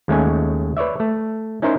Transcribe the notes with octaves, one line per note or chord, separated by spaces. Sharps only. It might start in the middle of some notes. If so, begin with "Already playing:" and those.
D#2 G#3 A3 C#4 G#5
B4 C#5 D5 E5
A3
C#4 D#4 E4 A#4 C5